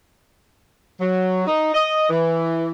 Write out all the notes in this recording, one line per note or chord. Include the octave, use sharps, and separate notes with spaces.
F#3
D#4
D#5
E3